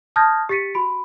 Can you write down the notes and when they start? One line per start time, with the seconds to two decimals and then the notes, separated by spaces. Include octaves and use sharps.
0.16 A5 D#6 F6 G6 G#6 A#6
0.49 G4 A6 B6 C#7 D#7
0.74 F#4 B5 D7